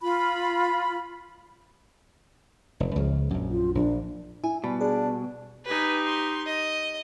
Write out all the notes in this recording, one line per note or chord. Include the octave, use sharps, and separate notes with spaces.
F4 B5
F1
C#2 C#3 F3
A#1 F#2
F4
A#1 D4
E4 G#5
B2 G3 A5 B5
D4 G#4
D#4 G4 B4 G#5
C6
D#5